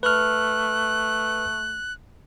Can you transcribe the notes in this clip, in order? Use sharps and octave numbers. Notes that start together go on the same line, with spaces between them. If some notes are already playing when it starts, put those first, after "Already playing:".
A3 B4 F6 F#6